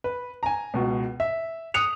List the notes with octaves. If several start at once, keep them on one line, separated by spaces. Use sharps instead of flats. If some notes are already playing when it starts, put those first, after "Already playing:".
B4
G#5 A#5
C#2 B2
E5
D#6 F#6 C#7 F7